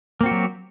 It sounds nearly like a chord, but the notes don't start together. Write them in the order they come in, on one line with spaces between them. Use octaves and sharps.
A#3 C4 F#4 G4 F#3